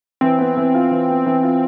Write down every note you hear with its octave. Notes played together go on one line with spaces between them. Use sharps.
E3 C4
B3
E3
F4
E3
B3
E3
F4